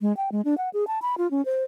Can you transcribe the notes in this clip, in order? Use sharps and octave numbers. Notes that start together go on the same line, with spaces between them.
G#3
G5
G#3
D4
F#5
G#4
A5
B5
F4
C#4
C5